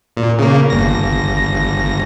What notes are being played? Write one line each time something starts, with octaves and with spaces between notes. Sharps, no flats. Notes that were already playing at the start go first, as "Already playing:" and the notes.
A#2
C#3 A#3
G1 A#6